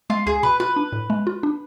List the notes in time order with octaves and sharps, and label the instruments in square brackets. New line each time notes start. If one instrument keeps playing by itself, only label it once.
[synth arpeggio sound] G#3 [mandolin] F4
[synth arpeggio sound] C#2 [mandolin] G#4
[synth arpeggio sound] B2 [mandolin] B4
[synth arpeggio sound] F4 [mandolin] B4
[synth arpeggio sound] D4
A2
G#3
F4
D4